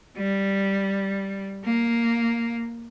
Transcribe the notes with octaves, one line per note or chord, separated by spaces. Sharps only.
G3
A#3